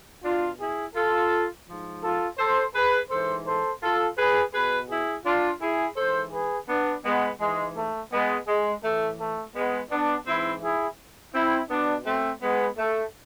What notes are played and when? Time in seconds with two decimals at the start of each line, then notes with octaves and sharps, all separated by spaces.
0.24 B2 D4 F4
0.60 E4 G#4
0.96 F4 A4
1.68 G#2 F3
2.04 F4 A4
2.39 A4 C5
2.75 G#4 B4
3.10 G#2 E3 A4 C5
3.47 A4 C5
3.82 F4 A4
4.18 G#4 B4
4.54 B2 G#4 B4
4.90 E4 G#4
5.26 D4 F4
5.62 E4 G#4
5.97 G#2 E3 A4 C5
6.33 G#4 B4
6.69 B3 D4
7.05 G#3 B3
7.41 G#2 E3 G#3
7.77 A3
8.12 G#3 B3
8.48 G#3
8.84 A2 E3 A3
9.20 A3
9.56 G#3 B3
9.92 B3 D4
10.27 G#2 E3 C4 E4
10.63 E4 G#4
11.35 C4 E4
11.70 B2 B3 D4
12.06 A3 C4
12.42 G#3 B3
12.79 A3